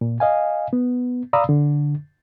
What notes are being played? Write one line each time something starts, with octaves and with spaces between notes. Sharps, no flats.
A#2
D#5 F5 G#5
B3
D5 F5 A#5 B5 D#6 E6
D3